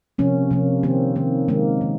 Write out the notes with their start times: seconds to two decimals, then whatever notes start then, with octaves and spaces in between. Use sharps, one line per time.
0.18 C3 F3 A#3 C#4
0.51 C3 F3 A#3
0.83 D#3 A#3 C4
1.16 D#3 A#3
1.48 D#3 G#3 A#3
1.81 D#3